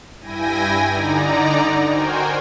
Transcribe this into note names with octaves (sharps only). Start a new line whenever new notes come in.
G2 E4 G5 G#5 A#6 D#7
D3 D#4 D5 A#5
F#4 A#4 C5 G5 G#5